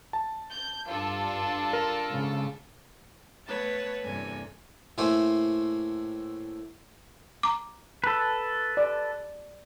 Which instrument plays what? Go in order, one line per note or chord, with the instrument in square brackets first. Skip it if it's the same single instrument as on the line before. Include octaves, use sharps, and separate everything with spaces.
[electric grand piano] A5
[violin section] G6
[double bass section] G2 [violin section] D4 F4 A4
[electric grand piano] A#4
[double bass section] G#2 C#3
[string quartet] A3 B3 B4 C#5 A5
E2 G2 C3 A#3 A4 G#5
[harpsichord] A2 A3 A#3 C5 E5 G#5
[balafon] A#5 D6
[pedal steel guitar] A4 B4
[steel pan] D5